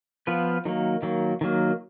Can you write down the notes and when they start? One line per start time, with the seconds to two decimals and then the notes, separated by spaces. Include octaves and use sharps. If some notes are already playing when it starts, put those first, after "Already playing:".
0.27 F3 B3 F4 B4
0.65 D#3 F#3 A#3
1.02 D#3 F#3 A#3
1.41 D#3 F#3 A#3